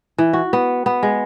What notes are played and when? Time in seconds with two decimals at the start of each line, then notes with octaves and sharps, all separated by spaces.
0.18 E3
0.33 F#4
0.53 B3
0.86 B3
1.03 G#3